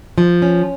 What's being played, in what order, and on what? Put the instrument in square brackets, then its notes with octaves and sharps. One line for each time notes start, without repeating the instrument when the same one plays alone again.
[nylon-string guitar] F3
C#4